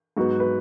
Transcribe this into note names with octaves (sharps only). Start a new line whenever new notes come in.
G#2 F#3 B3 F#4
B4